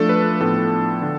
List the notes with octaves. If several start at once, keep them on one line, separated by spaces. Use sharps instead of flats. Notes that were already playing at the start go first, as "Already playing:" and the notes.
Already playing: F3 A3 D4 A4
B4
A2 F3 B3 D4 A4
D3